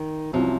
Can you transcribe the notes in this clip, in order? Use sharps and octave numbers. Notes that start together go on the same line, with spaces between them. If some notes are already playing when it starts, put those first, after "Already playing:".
Already playing: D#3
C2 C3 F3 F#3 C#4